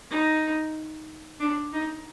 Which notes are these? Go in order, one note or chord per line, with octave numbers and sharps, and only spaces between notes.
D#4
D4
D#4